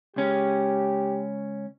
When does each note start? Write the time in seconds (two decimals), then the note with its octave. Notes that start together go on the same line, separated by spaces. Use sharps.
0.16 C#2 C#4 G4